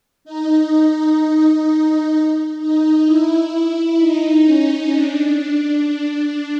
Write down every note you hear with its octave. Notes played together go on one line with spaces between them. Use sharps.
D#4
D#4
D#4
E4
D#4
C#4
D4